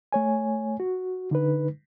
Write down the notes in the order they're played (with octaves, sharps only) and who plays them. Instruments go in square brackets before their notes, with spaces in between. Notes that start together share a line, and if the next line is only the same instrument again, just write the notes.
[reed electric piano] A3 C#5 G#5
F#4
D3 D#4 B4